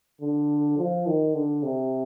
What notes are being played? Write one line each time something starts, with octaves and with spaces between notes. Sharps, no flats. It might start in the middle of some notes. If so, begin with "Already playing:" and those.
D3
F3
D#3
D3
C3